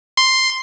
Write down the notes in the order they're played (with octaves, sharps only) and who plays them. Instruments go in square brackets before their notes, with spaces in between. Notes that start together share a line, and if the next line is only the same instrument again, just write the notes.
[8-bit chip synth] C6